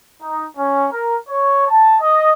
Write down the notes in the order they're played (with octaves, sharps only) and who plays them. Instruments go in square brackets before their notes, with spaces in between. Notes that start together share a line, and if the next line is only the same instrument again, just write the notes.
[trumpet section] D#4
C#4
A#4
C#5
A5
D#5